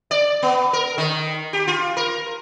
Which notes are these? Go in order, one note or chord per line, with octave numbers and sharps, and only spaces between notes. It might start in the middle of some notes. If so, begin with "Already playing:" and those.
D5
B3
A#4
D#3
G4
F4
A#4